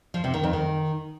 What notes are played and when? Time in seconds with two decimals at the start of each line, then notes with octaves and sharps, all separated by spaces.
0.14 F3
0.24 C3
0.34 D#3
0.43 F2
0.53 D#3